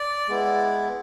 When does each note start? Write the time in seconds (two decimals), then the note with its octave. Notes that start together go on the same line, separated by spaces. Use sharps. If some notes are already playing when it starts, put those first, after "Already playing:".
Already playing: D5
0.29 G#3 B3 E4